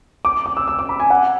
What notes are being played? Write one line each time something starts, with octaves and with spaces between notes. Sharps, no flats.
D6
D6
E6
E6
D6
B5
G#5
F#5